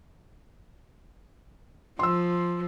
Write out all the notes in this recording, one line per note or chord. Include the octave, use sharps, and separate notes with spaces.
F3 C6 E6